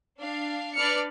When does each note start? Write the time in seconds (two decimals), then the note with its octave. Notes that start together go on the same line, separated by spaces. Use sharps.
0.18 D4 F5
0.75 D4 B4 D5 F6 C#7